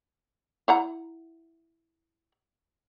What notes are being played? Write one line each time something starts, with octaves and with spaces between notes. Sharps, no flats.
E4 F#5 A#5